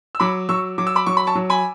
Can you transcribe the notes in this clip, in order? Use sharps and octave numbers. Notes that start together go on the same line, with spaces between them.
E6
F#3 B5 D6
F#3 C#6 E6
F#3 D6
E6
B5 D6
F#3 C#6
B5
A5 C#6
F#3
G#5 B5